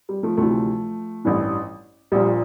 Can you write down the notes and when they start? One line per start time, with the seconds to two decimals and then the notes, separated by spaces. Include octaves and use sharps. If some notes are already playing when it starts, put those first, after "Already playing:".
0.09 G3
0.23 F3 A3
0.37 D2 C3 E3 F3 A3
1.25 A1 G2 E3
2.12 A#1 A#2 G3